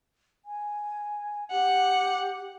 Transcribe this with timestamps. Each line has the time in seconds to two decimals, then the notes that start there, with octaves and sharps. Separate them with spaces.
0.45 G#5
1.51 G4 F#5